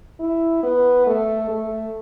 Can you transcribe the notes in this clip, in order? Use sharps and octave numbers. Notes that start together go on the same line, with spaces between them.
E4
B3
A3
A3